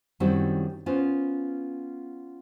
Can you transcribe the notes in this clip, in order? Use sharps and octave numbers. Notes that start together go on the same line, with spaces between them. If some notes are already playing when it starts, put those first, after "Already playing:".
F#2 D#3 G3 C4 E4 F#4
B3 C#4 F4 B4 C5